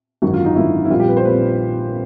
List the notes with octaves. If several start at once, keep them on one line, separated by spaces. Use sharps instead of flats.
G#1 F#2 D3 F#4
F4
D#4
G#1 F#2 D3 E4
E4
A#1 A#2 G3 C4 F4
G4
B4
C5
A#2 G3 C4 B4